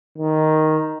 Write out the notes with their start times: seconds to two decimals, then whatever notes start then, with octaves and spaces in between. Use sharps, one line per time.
0.18 D#3